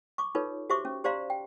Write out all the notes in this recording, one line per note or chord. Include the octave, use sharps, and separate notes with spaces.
C#6 D6
D#4 F4 A4 B4 C#5
F#4 G4 C5 E5 C#6 D6
C#4
G4 C5 D5 F5 A#5 C6
G5